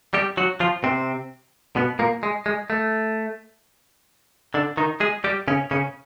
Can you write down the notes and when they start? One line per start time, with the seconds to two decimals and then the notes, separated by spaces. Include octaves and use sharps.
0.14 G3 G4
0.37 F#3 F#4
0.60 F3 F4
0.84 C3 C4
1.76 B2 B3
1.99 A#2 A#3
2.23 G#3
2.46 G#3
2.70 A3
4.54 D3 D4
4.77 D#3 D#4
5.00 G#3 G#4
5.24 G3 G4
5.48 C#3 C#4
5.71 C#3 C#4